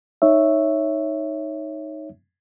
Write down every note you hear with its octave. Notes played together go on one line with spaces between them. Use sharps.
D#4 C#5 E5